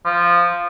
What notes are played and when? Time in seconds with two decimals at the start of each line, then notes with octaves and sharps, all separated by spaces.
0.05 F3